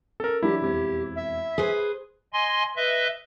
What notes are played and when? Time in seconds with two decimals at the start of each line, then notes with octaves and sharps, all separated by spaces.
0.20 C#4 A4 A#4
0.43 E3 F#3 D4 E4 G4
0.61 E1 F2 G4 G#6
1.16 E5
1.58 G#4 B4 C5 G#5
2.33 D#5 G#5 C6
2.76 B4 D#5 E5